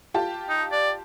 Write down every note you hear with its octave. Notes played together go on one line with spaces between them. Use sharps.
F4 G4 A5
D#4
D5